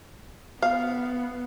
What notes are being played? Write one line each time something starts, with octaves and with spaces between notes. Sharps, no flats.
B3 F5